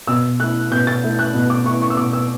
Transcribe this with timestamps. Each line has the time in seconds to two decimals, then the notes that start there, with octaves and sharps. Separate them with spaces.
0.07 B2 E6
0.40 A3 E4 F#6
0.71 B2 G6
0.87 A6
1.03 A3 E4
1.19 F#6
1.34 B2
1.50 D6
1.66 A3 E4 C#6
1.82 C#6
1.90 E6
1.97 B2 D6
2.13 E6